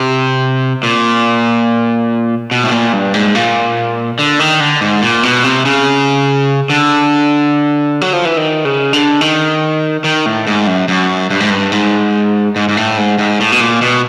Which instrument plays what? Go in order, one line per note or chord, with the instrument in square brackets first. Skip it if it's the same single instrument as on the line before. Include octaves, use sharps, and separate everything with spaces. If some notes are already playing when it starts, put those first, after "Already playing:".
Already playing: [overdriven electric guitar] C3
A#2
B2
A2
A#2
G2
G#2
A#2
D3
D#3
D3
G#2
A#2
B2
C3
C#3
D3
F#3
F3
E3
D#3
C#3
D3
D#3
D#3
A2
G#2
F#2
F#2
G2
G#2
G2
G#2
G#2
G#2
A2
G#2
G#2
A2
B2
A#2
B2